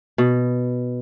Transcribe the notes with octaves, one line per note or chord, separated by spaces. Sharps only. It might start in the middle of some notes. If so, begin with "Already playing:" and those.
B2